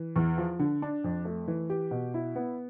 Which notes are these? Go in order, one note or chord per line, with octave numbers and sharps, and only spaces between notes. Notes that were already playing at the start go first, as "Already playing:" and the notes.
Already playing: E3
E2
F3
D3
D4
F2
A3
E3
G4
B2
E4
B3